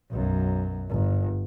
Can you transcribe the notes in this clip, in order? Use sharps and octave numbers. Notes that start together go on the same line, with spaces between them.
B1 F#2
G1